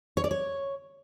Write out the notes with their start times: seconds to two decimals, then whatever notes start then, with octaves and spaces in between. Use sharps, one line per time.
0.17 C#5
0.24 D5
0.31 C#5